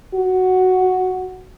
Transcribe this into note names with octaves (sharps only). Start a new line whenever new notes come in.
F#4